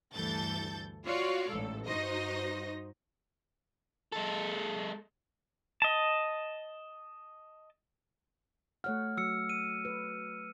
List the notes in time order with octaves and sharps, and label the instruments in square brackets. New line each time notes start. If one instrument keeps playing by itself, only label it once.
[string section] D2 G2 E3 A4 G6 A6
F4 F#4 C#5 D5 F5
A1 G#2 A4
G2 D#4 F#4 C5 D#5 A#6
[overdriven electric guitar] G#3 A4
[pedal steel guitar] D#5 A5
[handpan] A3 C#5 F#5 [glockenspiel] F6
[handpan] F#3 [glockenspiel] E6 C#7
[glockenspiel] D#7
[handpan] B4